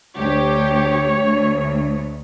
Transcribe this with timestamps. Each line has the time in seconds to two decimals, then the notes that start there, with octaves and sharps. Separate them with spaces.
0.18 D2 G4 C#5
1.22 D2